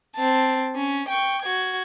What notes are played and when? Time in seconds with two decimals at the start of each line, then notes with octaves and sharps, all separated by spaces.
0.16 C4 A5
0.75 C#4
1.08 G5 C#6
1.42 F#4 G#6